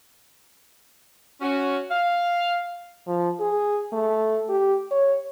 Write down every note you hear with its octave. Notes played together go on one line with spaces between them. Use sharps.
C#4 F#4
F5
F3
G#4
A3
G4
C#5